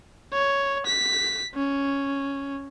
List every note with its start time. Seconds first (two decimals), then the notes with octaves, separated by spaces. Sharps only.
0.33 C#5
0.86 B6
1.55 C#4